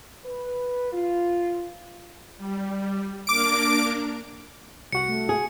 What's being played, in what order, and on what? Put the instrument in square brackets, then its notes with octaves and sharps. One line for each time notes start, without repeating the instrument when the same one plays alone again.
[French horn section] B4
F4
[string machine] G3
[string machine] A#3 D4 A#4 [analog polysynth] D6 D7
[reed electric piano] C2 F#4 F#5 [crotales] C#7
[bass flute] A3
[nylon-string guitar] G#4